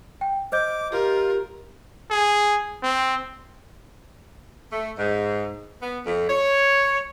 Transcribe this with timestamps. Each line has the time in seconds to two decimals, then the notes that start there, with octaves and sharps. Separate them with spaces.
0.21 G5
0.52 C5 D#5 D6 G6
0.92 F4 G4 A#4
2.11 G#4
2.83 C4
4.73 A3
4.98 G#2
5.82 B3
6.06 F2
6.29 C#5